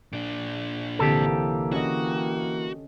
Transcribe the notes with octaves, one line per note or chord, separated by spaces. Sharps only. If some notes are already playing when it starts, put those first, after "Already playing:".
A#2 D4 D7
C2 D3 E3 A#3 C4 G4 A4
C#4 F#4 D#5